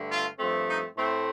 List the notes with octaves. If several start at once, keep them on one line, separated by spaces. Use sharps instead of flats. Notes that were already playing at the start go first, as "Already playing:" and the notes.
Already playing: G2 D3 A3
F4
G2 F3 A3 C4
D#4
A2 A3 C4